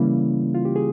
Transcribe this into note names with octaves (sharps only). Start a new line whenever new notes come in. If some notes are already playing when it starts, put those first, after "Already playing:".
Already playing: C#3 E3 G3 A#3 C#4 E4
F4
G4
G#4